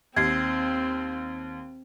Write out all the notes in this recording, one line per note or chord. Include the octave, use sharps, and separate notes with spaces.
D#2 C4 G#6 C7